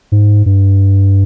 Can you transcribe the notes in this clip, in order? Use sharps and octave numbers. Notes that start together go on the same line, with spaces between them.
G#2
G2